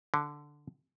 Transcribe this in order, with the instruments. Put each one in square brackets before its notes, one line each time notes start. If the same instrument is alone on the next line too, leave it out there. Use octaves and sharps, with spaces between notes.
[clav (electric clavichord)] D3